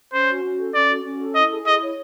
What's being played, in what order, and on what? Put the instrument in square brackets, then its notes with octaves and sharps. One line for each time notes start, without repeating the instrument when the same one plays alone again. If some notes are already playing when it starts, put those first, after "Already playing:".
[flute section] C#4 [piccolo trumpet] C5
[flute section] F#4
C#4
A4
[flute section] C#4 [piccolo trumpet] D5
[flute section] F#4
C#4
A4
[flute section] E4 [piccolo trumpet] D#5
[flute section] G#4
[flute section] E4 [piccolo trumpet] D#5
[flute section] C#5